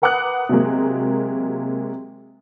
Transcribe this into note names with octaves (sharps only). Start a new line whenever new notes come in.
A#4 B4 F#5 D6 D#6 F#6
C3 F#3 G#3 A#3